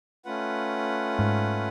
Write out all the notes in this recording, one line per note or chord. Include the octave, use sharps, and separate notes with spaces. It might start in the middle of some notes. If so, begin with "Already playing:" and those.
A3 C#4 F4 B4 F#5
G#2